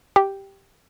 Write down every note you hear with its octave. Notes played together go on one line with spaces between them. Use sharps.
G4